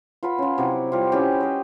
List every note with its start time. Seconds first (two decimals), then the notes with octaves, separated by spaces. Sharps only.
0.23 F4 B4 F#5 B5
0.38 C#4 F4
0.58 C3 F#3 E4 G5
0.92 G3 C4 F4
1.12 C#4 E4 G4 B4
1.40 C5 D#5